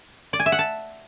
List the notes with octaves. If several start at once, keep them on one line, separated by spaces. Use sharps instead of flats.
D5
G#5
E5
F#5
A5